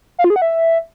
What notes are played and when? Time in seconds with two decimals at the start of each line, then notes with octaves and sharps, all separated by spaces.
0.18 F5
0.24 F4
0.30 G#4
0.36 F#5
0.42 E5